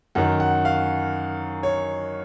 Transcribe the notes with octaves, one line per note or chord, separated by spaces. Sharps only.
F#2 D#3 F#5
F#5
F5
C#5